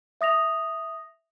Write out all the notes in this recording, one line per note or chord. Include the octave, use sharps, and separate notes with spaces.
E5 D#6 A#6 F7